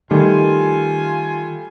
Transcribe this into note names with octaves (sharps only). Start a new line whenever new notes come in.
D#3 G3 A3 F4 G#5